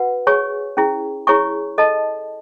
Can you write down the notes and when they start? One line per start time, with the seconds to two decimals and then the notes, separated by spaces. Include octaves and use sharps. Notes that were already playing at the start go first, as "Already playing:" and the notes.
Already playing: F#4 B4 F#5
0.27 G#4 C#5 G#5 C#6
0.77 C#4 E4 G#4
1.27 E4 G#4 C#5 G#5 C#6
1.78 A4 D#5 A5